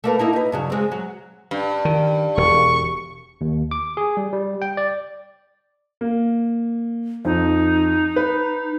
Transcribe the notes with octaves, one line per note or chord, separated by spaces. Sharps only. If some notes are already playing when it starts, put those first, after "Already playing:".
A3 A#3 B4
A#3 D#4 E4
D#4 B4
G2 C#3 F#3
G#3 C4
F#3
G2
D#3
E1 C#6
D#2
D6
G#4
G3
G3
G5
D5
A#3
F2 D#4
B4